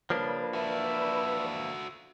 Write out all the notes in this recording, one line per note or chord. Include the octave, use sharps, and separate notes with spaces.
C#3 F3 G3 A#3 D4 B4
E4 F#4 A4 D5 E5